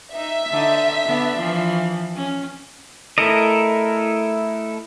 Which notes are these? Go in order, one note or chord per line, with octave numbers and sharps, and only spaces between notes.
D#4 E5
D3 D#4
D3 B3 D4
E3 F3
C#4
A3 E4 A4 A#4 D#5